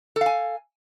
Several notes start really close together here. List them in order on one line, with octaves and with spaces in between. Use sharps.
A4 F5 G#5